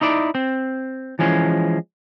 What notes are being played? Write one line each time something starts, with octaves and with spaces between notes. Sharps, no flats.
D#4 E4 D5
C4
E3 F3 G#3 C#4